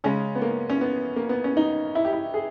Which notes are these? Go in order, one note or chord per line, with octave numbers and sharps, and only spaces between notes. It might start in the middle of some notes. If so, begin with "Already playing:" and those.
C#3 G#3 C#4
B3
A#3
C#4
B3
A#3
B3
C#4
D#4
E4
G4
E4
G#4